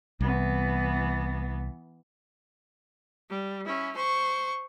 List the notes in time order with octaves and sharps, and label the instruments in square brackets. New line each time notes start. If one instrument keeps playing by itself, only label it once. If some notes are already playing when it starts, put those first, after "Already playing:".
[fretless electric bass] C2 [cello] E3 B3
[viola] G3
C#4 E4
C5 C#6